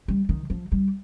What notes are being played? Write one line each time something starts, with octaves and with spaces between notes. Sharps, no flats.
G3
D#3
F3
G3